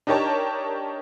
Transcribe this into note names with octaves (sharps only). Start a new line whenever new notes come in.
D4 D#4 G4 A#4 C#5 A5